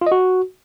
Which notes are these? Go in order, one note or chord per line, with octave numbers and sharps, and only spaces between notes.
F4
D#5
F#4